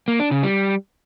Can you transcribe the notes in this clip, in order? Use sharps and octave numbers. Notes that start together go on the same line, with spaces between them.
A#3
D4
C#3
G3